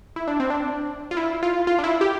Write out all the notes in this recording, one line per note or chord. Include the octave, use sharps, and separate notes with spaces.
E4
D4
C4
D4
F4
E4
F4
F4
D4
E4
G4